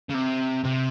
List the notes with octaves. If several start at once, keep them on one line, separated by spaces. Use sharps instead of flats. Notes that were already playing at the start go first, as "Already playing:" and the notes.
C#3
C3
C3